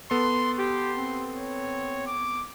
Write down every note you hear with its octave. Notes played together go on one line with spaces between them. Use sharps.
B3 A4 C6
G4 C6
C4
C#5
D6